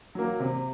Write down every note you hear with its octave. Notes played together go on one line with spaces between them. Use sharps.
F#3 A#3
C3